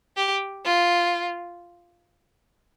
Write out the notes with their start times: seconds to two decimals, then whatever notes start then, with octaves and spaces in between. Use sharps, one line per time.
0.17 G4
0.65 F4